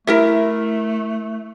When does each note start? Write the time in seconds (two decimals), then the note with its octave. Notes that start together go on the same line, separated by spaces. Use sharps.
0.07 A3 E4 A#4 E5